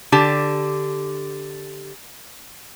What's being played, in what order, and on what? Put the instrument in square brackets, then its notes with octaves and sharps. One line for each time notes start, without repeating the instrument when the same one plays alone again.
[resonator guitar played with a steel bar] D3 G4 A5